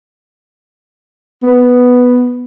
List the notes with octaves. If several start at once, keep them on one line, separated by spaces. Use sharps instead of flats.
B3